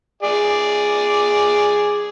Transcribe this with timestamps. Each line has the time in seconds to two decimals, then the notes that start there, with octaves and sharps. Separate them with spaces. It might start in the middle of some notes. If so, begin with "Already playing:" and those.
0.23 G#4 D5